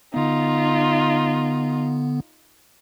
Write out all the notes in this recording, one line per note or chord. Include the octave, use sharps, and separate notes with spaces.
D3 B3 D#4 F4